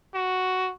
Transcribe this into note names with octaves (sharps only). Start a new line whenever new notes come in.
F#4